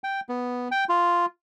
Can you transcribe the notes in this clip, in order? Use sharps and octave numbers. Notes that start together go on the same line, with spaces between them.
G5
B3
G5
F4